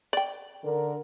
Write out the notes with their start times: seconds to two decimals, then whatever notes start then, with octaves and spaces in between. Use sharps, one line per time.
0.13 D5 G5
0.64 D3 A#4